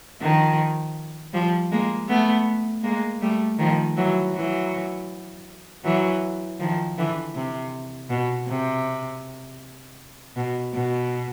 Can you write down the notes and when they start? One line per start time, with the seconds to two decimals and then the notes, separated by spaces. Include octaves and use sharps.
0.21 D#3 F3
1.33 F3 G3
1.71 G#3 A#3
2.09 A3 B3
2.83 G#3 A#3
3.22 G3 A3
3.59 D#3 F3
3.97 E3 F#3
4.34 E3 F#3
5.84 E3 F#3
6.60 D#3 F3
6.97 D3 E3
7.35 C3
8.10 B2
8.48 C3
10.36 B2
10.73 B2